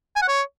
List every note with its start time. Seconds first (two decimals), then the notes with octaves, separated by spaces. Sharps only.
0.16 G#5
0.22 F#5
0.28 C#5